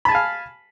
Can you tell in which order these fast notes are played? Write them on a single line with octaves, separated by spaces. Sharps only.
B5 A5 G#5 F5